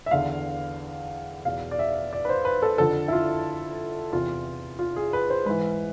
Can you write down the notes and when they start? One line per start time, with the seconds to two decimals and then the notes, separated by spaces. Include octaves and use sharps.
0.06 E5
0.11 E2 D3 F5
1.45 E2 B2 F5
1.71 D5
1.79 E5
2.13 D5
2.25 B4
2.29 C5
2.45 B4
2.62 A4
2.78 F2 D3 A4
3.08 E4
3.13 F4
4.12 E2 C3 E3 F4
4.79 F4
4.96 G#4
5.13 B4
5.30 C5
5.46 G#2 E3 B4